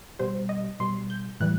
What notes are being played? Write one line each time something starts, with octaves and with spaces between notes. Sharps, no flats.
B2 G3 C5
D#5
B2 G3 C6
G6
A2 E3 G3 F#6